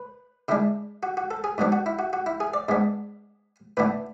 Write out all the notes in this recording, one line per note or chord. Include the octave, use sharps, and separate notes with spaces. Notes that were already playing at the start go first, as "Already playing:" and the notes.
Already playing: B4
C#3 G#3 D4 E4
F#4
F#4
A4
G#4
G#2 F#3 B3 D4
F#4
E4
F#4
F#4
E4
G#4
D5
G#2 G#3 B3 D4
A2 E3 B3 D4 B4